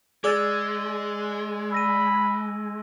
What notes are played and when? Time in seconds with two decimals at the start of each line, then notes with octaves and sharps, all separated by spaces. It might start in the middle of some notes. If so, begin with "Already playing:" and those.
0.24 G#3 G#4 D5 D6 E6 A6
1.72 B5 E6 A#6 D#7